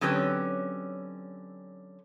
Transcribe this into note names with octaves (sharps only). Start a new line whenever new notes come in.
D3 F#3 C4 C#4 G4 B4